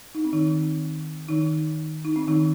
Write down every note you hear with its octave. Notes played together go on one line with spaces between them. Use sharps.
D#4
C4
D#3 D#4
D#3 D#4
D#4
C4
D#3 D#4